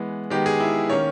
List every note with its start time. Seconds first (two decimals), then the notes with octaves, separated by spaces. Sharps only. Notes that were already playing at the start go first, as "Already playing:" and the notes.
Already playing: E3 G#3 B3
0.30 D#3 G#3 B3 G4
0.46 G#4
0.60 E4
0.90 D#3 A#3 C#4 C#5